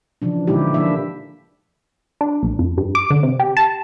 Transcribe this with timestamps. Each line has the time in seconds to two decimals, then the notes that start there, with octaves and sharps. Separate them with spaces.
0.22 C#3 E3 F3 D4
0.47 A#2 D3 G#3 D#4 E4 G4
0.74 F3 A#3 D4 E4 E5
2.21 D4
2.43 A#1
2.59 F2
2.77 G2
2.95 D6
3.10 D3
3.23 C3
3.40 G4
3.57 A5